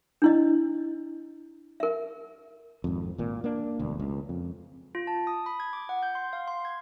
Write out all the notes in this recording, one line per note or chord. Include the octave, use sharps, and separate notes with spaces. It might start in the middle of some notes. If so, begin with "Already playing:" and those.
D4 E4 D#5
A#4 E5
G#1 F2
G#1 A#2
A#3 D4
E1 D2
C#2
F2
F4
A5
D#6
B5
G#6
D6
F#5
G6
C6
F5
C6
G#6